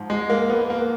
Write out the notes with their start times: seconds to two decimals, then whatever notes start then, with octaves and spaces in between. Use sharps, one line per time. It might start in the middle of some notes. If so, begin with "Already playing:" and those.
Already playing: G#2 F3
0.10 G#3
0.30 A#3
0.50 B3
0.70 A#3